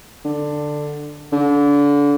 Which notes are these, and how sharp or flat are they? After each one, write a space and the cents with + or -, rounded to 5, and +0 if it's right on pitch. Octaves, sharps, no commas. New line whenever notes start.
D3 +10
D3 -30